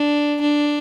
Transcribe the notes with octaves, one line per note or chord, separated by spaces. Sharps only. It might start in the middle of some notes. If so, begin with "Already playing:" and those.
Already playing: D4
D4